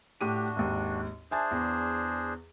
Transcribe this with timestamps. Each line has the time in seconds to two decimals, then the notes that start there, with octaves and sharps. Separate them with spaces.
0.21 A2 D4 F#4 G4 D#7
0.56 G#1 D#2
1.31 D4 G#4 C5 E5 G#5 A5
1.51 E2